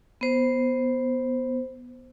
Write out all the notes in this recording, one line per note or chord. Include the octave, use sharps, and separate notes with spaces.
B3 C5